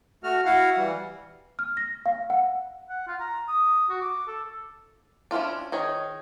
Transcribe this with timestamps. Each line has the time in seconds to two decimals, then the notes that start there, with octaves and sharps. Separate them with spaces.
0.24 A3 F#4 F6
0.45 E4 F#4 F5 F#5
0.76 E3 G3
1.59 F6
1.77 A#6
2.06 F5
2.30 F#5
2.89 F#5
3.07 F4
3.20 A#5
3.48 D#6
3.89 F#4
4.01 D6
4.27 A4
5.31 C#4 D4 E4 F4 D5
5.72 D#3 G#4 C#5